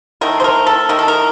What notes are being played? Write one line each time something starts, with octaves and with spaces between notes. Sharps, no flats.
D#3 A3 A#4
C5
A#4
A4
D#3 A3 A#4
A4
A#4